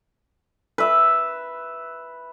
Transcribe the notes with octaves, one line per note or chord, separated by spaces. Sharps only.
B4 E5